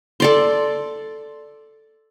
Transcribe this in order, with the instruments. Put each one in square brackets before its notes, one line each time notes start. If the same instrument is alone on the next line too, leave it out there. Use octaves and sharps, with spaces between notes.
[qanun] A4 D5 C6